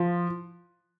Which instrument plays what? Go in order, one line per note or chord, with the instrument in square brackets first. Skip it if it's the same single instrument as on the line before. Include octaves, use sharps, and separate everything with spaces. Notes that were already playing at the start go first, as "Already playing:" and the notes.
Already playing: [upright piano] F3